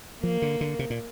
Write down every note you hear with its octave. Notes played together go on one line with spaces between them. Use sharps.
F3 A#3
D3
D3
C3
A#2